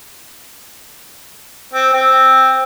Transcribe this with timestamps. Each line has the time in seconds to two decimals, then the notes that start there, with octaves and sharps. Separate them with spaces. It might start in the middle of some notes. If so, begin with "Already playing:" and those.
1.73 C4
1.93 C4